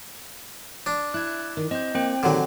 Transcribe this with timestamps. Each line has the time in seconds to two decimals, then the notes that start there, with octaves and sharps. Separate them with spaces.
0.86 D4
1.14 E4 F#6 G#6
1.57 D#3
1.71 C4 D#5 G6
1.95 A#3 C4 C5 G5
2.23 A#2 D3 D#3 F#3 G4